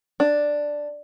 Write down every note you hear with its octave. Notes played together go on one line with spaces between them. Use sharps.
D4